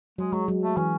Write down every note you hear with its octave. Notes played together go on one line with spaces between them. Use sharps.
F#3 G#3
F#3 G#3
F#3
A3
E3 C#4